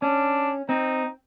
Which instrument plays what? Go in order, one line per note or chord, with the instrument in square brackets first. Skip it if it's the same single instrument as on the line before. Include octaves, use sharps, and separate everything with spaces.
[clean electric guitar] C#4 [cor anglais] D4
[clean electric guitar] C4 [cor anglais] D#4